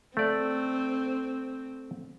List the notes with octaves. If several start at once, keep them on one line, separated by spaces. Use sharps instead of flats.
A3 C4 D5